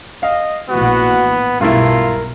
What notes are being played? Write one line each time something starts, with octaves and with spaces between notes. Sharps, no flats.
D#5 F5
A#1 A2 E3 B3 F#4
B1 G2 A3 E4 F4 A#4